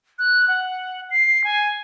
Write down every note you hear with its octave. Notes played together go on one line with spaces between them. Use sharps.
F#6
F#5
C7
G#5